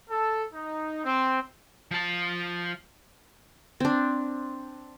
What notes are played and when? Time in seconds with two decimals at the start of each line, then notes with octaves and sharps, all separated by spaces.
0.10 A4
0.54 D#4
1.04 C4
1.91 F3 A5
3.80 C4 D4